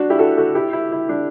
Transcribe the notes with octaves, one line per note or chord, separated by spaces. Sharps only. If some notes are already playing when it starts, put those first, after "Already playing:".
Already playing: D4 F#4
E4 G4
F#4 A4
F#4 A4
E4 G4
E4
E4
D4